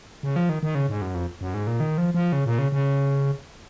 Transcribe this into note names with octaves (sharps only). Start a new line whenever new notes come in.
C#3
F3
D#3
D#3
C#3
G#2
F#2
F2
F#2
G#2
A#2
D#3
F3
F3
C#3
A#2
C#3
C#3